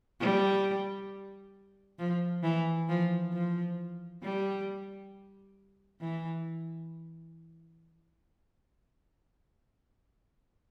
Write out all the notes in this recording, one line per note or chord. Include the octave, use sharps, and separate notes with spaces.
G3
F3
E3
F3
F3
G3
E3